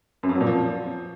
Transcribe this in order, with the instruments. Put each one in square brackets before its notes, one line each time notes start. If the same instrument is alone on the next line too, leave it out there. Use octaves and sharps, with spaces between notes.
[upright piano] F#2
F2
F#3
A#2
F3